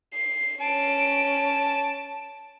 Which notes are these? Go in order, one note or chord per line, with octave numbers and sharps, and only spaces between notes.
C7
C#4 A5 D7